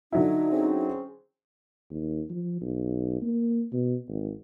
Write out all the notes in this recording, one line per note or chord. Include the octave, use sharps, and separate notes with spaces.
D3 F#3 D#4 E4
C4 C#4 G#4
D#2
F3
B1
A#3
B2
G#1